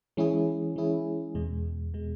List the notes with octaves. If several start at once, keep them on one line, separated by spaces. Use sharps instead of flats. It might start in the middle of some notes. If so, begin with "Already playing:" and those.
E3 G#3 C#4 E4 G#4
E3 G#3 C#4 E4 G#4
E2 B2 G#3
B2 G#3